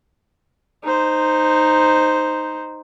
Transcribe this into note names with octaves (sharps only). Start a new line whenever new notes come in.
D#4 C5